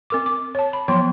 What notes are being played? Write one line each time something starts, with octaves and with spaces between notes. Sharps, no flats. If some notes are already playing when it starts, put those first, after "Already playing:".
C4 A#4 D6
D6
C#5 A5
B5
F3 F#3 B3 C#5 G5 C6